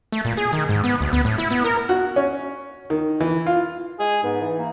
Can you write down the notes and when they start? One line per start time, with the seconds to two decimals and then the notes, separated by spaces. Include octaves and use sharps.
0.12 A3
0.25 A#2
0.37 G#4
0.53 D#3
0.69 G#2
0.84 B3
1.01 D2
1.13 B3
1.25 A2
1.38 E4
1.51 B3
1.64 A#4
1.89 F#4
2.16 C#4
2.90 D#3
3.20 E3
3.47 F4
3.99 G#3 G#4
4.24 G#2 B3
4.41 E3
4.58 A#3